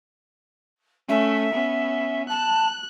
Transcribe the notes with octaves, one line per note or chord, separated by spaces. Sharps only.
A3 C#4 E5
B3 C#4
A5 F#6